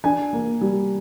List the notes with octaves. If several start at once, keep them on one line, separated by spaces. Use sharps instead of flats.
D4 G#5
A#3
G3